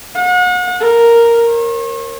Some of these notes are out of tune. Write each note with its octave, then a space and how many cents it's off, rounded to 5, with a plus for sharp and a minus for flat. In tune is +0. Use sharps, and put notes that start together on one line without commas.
F#5 -40
A#4 +0
C#5 -40